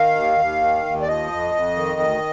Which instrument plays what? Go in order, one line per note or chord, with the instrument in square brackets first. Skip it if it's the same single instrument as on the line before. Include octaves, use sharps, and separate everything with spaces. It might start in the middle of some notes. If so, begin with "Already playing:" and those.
Already playing: [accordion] D#3 F5
D#2
D#2
D#3
D#2
D5
F3 D#5
F2
F2
D#3
D2